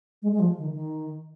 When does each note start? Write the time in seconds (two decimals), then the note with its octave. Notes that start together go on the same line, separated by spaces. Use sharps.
0.22 G#3
0.33 G#3
0.40 F3
0.58 D#3
0.73 D#3